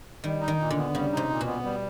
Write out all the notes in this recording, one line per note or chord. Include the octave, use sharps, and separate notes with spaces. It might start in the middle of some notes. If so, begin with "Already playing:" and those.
D#3 G3
D#4
D#3
A#2
D3
B3
C#3 G3
C3 D#4
A#2
B2
B3
G3